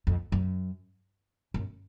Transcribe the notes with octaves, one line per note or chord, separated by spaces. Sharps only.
F2
F#2
F#2